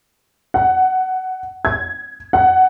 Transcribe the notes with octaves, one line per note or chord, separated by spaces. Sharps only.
F#5
G#6
F#5